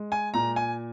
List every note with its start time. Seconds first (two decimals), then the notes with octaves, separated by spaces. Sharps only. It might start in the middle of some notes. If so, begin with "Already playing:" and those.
Already playing: G#3
0.12 G#5
0.34 A#2 A#5
0.56 G#5